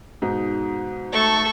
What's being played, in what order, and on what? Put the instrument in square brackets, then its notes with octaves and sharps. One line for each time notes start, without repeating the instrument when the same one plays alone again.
[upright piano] G#2 B2 D#4
[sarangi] A3 [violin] A4 C#6